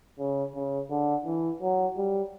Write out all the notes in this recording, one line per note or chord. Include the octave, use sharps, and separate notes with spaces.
C#3
C#3
D3
E3
F#3
G3